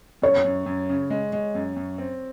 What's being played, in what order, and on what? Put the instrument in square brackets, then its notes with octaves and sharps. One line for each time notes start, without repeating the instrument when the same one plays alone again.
[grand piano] F#2 [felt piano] C#5
[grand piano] F#2
F#2
C#3
G#3
G#3
F#2
F#2
C4